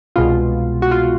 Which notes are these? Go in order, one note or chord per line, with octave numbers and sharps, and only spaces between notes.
C2 B2 G#3 B3 F4
F#4
F4